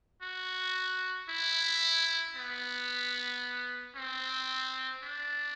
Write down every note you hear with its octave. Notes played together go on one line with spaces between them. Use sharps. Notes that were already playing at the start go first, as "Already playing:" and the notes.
F#4
E4
B3
C4
D4